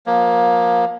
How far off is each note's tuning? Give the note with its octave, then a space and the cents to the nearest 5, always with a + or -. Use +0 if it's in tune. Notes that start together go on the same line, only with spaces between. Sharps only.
F3 +30 A#3 +20